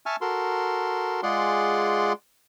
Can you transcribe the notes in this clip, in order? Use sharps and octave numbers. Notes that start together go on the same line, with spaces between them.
E5 G#5 A5 C#6 F6
F#4 A4 A#4 C6
G#3 F4 G#4 D5 F#5 C6